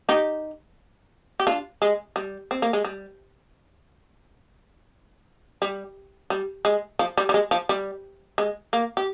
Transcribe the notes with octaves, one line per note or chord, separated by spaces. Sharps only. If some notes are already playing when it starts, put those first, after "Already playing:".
D#4 G4
G4
D4 F4
G#3
G3
C4
A#3
G#3
G3
G3
G3
G#3
F3
G3
G3
G#3
F3
G3
G#3
A#3
G4